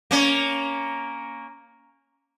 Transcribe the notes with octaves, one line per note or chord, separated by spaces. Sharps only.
A#3 C#4